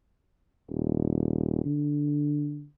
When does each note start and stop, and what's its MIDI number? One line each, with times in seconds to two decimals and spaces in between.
0.70 1.64 27
1.65 2.66 50